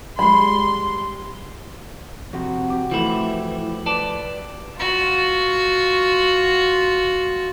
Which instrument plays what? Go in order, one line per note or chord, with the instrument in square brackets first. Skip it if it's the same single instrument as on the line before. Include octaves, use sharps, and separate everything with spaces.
[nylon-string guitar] G3 G#3 [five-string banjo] B5 [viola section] C6
[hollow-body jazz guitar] F2 C3 [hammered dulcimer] F#4
[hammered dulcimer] G4
[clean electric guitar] E3 E4 [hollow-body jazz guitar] F3 A3
[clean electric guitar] B4 D5 A5
[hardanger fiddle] F4 F#4